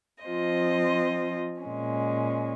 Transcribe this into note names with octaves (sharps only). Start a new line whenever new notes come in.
F3 C4 F4 C5 D#5
A#2 G#3 C#4